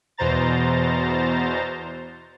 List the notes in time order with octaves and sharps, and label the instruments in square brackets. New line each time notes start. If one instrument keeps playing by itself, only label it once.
[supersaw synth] E2 B2 C5 A#5 A6